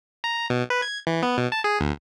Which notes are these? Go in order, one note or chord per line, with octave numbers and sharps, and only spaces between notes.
A#5
B2
B4
G#6
E3
B3
B2
A5
G#4
D2